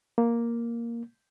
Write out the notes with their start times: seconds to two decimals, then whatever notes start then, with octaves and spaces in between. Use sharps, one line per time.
0.18 A#3